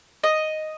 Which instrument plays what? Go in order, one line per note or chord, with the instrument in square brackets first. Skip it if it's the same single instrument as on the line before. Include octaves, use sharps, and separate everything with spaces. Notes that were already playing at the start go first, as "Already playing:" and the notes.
[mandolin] D#5